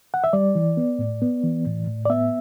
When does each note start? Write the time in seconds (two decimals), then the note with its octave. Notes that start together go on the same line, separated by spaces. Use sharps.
0.14 F#5
0.24 E5
0.33 G3 D5
0.55 E3
0.77 B3
0.99 A2
1.22 B3
1.44 E3
1.66 A2
1.87 A2
2.06 D5
2.10 B3 E5